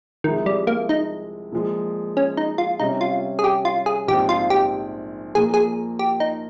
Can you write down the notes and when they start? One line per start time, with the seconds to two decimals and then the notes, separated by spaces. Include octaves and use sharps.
0.24 C2 C3 D#3 F3 G#3
0.46 G3
0.67 A#3
0.89 D#4
1.52 A#2 F3 G#3
2.17 C#4
2.37 D#4
2.58 F4
2.80 C3 G3 C#4 D#4
3.01 F4
3.39 G#4
3.44 G4
3.65 F4
3.86 G#4
4.08 A#1 G#2 F3 C4 G4
4.29 F4
4.50 G4
5.35 A#2 F3 A#3 G#4
5.54 G#4
5.99 G4
6.20 D#4